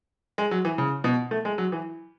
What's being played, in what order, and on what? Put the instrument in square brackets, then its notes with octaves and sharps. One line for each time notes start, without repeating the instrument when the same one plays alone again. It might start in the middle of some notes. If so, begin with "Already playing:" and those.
[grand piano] G#3
F#3
E3
C#3
B2
A3
G#3
F#3
E3